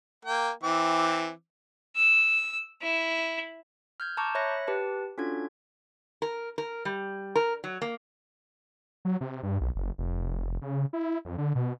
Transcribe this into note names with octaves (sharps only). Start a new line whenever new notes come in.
A#3 G5
E3 C4 D6
E6
E4
F6 G6 G#6
A5 A#5 C#6 D6 G6
C#5 E5 B5 F#6 A#6 C#7
G4 B4 A5
C#4 D4 F4 F#4 A4 G#6
A#4
A#4
G3
A#4
F#3
A#3
F#3
C3
G2
B1
F#1
F1
C#3
E4
F2
D3
B2